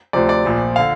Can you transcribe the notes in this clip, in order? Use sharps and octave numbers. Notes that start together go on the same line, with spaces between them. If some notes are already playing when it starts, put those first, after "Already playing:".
D2 C3 F3 D5
D5
A#1 A#2 F3
D3 F5